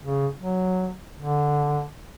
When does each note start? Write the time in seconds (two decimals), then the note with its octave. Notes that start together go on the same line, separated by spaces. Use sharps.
0.04 C#3
0.38 F#3
1.19 D3